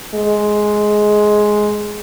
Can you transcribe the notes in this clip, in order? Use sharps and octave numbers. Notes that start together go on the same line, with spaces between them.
G#3